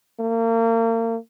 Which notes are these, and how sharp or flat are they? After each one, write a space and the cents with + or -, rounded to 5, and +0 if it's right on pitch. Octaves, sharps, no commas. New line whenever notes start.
A#3 -35